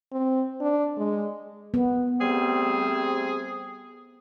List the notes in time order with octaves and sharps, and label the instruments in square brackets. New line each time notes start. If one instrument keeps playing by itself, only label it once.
[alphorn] C4
D4
G#3
[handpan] B3
[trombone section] G3 A3 C4 [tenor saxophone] G#4